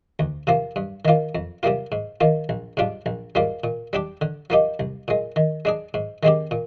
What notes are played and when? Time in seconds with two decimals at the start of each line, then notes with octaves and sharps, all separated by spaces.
0.19 D2
0.47 C3 F3 A#3
0.76 G2
1.05 D#3 A#3 F4
1.35 F2
1.63 C3 G3 A#3 F4
1.92 G#2
2.21 D#3 A#3 F4
2.49 A#1
2.77 G#2 G3 D4 F4
3.06 A#1
3.35 G#2 G3 A#3 F4
3.64 A#2
3.93 G3 D4 G4
4.21 D3
4.50 F3 A#3 D#4 G4
4.80 C2
5.08 A#2 G#3
5.36 D#3
5.65 G#3 D4 G#4
5.94 G#2
6.23 D#3 G#3 C4 G4
6.51 A#2